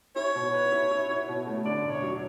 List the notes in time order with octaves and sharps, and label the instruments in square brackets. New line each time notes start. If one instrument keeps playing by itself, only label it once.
[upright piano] E4 [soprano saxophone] C#5
[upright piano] B2
B4
E4
E4
E4
B2
A3
[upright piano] D3 [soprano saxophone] D5
[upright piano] E1
[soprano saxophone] C#5
[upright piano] F#3